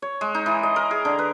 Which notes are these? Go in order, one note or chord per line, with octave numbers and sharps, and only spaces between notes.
C#5
G#3
D#4
E3
D#5
A#4
G#4
D3
B4